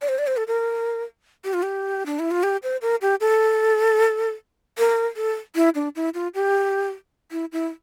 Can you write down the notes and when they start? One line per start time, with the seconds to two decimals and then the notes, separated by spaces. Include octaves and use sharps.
0.02 D5
0.09 C5
0.18 D5
0.27 C5
0.37 A4
0.48 A#4
1.44 G4
1.54 F4
1.63 G4
2.06 D4
2.19 E4
2.31 F4
2.43 G4
2.63 C5
2.82 A#4
3.02 G4
3.21 A4
4.78 A#4
5.16 A4
5.55 E4
5.75 D4
5.96 E4
6.14 F4
6.35 G4
7.32 E4
7.52 E4